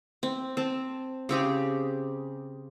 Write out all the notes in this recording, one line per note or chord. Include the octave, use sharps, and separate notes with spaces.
C4
C4 A5
C#3 C4 G4 G#4